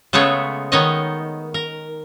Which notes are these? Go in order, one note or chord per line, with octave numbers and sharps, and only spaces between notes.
C#3 G#3 A3 B3 C#5
D#3 B3 D#4 C#5 D#5
A#4